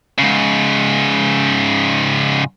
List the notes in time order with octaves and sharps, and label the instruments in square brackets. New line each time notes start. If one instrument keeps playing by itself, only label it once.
[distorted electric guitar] G#2 C#3